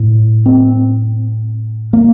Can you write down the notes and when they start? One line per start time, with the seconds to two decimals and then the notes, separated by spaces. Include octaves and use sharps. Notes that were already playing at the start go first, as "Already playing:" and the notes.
Already playing: A2
0.46 C4
1.93 A#3